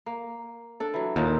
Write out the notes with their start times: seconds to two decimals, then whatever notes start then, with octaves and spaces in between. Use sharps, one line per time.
0.06 A#3
0.80 D4 A4
0.94 E3 F#3
1.16 D#2 A#2 D#4 G4